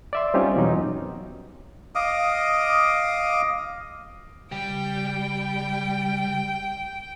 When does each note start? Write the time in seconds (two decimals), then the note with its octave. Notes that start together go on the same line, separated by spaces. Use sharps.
0.13 D5 E5 C6
0.34 G3 C4 C#4 D#4 F4 G4
0.56 E2 B2 F#3 D#4
0.73 F#2
1.95 D#5 F5 D6 D#6
4.52 C#3 G3 G5